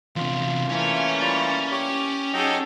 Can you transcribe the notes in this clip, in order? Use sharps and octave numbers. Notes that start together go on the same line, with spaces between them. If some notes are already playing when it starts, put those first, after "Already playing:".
E2 C3 F4
E3 A3 A#3 C#4
G3 F4 D5
G4 C#5
F#3 D#4 G#4 A4 D#5 G5